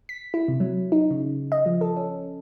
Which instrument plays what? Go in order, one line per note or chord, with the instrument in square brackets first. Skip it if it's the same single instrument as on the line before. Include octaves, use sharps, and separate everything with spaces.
[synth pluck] B6
E4
C3
F#3
D#4
C#3
D#5
F3
A4
C#4